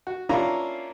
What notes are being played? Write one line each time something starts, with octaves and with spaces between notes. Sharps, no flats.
F#4
A#3 C#4 D4 E4 F4 A#5